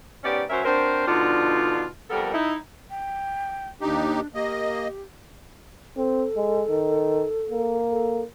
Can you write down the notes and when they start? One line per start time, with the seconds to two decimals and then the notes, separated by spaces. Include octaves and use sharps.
0.24 G#2 B3 C#4 G4 D5
0.50 F#3 C#4 A#4 C5 C#5 E5
0.65 C4 D4 F#4 A#4 C5
1.08 B2 D3 F3 D4 D#4 F4
2.10 F2 G3 B3 A4 A#4
2.34 D#4 E4
2.89 G5
3.81 D#2 D4 D#4 G4
4.35 A#3 G4 D#5
5.97 C4 A4
6.36 G#3
6.69 D#3
7.50 A#3
7.91 A4